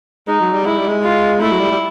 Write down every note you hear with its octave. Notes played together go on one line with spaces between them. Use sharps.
G#3 D#4
F#3
G3
G#3 E4
G3
G#3
F4
A3 E4
F#3
G3
G3